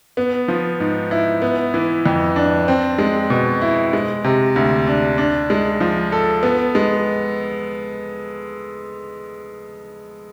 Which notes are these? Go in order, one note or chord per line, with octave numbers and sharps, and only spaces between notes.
B3
F3
G#2
E4
B3
E3
F2
D4
C4
G#3
B2
E4
G#3
C3
D2
D4
D4
G#3
F3
A4
B3
G#3